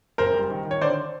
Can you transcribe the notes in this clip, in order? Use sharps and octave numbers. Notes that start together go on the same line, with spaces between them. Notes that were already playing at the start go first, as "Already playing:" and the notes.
F#1 A#4 C5
G3
D#3
D#3
C#5
D3 C5 D5